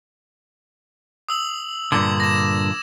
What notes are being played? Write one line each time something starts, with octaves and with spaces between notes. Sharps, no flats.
D#6 E6 F#7
G2 A#2 D3 D6 E6 G#6
A#6 E7